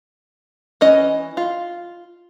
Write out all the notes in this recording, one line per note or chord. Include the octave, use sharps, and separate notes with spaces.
E3 C#4 D#5
F4